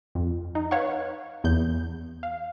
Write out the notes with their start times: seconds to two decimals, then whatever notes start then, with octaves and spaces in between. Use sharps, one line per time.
0.15 F2
0.55 D#4
0.71 B4 C#5 F5 F#5 C#6
1.44 E2 G6
2.23 F5